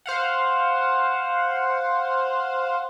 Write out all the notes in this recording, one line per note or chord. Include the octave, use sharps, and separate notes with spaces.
C5 F5 F#5